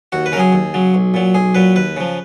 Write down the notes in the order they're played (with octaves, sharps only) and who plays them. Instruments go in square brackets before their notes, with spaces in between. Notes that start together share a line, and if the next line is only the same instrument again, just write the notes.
[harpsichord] D#2 F#4
B4
C#3 A#4
F#3 G#4
D#2
C#3 F#3
B1
A#2 F#3
B1 G#4
A#2 F#3 B4
D#2 B4
C#3 F3